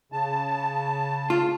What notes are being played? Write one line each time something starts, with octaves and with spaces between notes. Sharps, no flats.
C#3 A5
F4